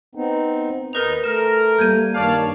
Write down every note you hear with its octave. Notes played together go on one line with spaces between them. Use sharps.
B3 C4 D#4
D#2 B3 D#4 A#4 B4 F7
A3 A#4 E7
G3 A#3 G6 G#6 D#7
G2 D#3 C#5 D5 F5 A5